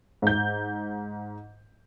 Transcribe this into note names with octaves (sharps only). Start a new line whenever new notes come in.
G#2 G6